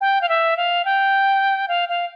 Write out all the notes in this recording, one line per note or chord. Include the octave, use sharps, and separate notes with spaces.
G5
F5
E5
F5
G5
F5
F5